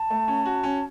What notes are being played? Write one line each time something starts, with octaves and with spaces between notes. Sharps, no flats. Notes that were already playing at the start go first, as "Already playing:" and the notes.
Already playing: A5
A3
C#4
F#4
C#4